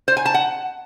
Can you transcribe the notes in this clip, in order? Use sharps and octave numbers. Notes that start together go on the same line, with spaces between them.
C5
G#5
A5
F#5